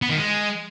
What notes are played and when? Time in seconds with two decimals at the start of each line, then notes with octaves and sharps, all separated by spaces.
0.02 B3
0.10 D#3
0.17 G#3